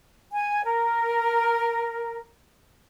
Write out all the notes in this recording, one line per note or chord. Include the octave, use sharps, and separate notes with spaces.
G#5
A#4